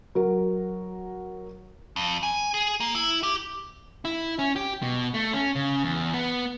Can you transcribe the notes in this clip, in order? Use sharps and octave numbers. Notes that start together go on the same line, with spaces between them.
F#3 A#4
F2
G#5
G#4
A#3
E4
G4
E4
C#4
G4
B2
A3
C#4
C#3
E2
B3